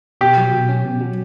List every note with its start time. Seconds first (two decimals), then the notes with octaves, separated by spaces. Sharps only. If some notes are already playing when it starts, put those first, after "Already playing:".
0.21 B2 G4
0.37 F#3
0.53 B2
0.69 C#4
0.84 B2
1.01 F#3